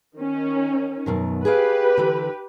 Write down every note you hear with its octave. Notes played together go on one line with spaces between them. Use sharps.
D#3 C#4
F#2 B2 D#3
G4 G#4 B4 D5 F5
D3 E3